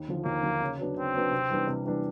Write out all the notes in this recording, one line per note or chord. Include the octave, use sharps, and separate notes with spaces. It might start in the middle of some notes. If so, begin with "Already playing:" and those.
Already playing: D#2
D3 F3
D#2 A#3
D3 F3
C#3
F#3 B3 D4
C#3 C4
F#3 B3 D4
C3
E3 G3 B3 D4
C3
E3 G3 B3 D4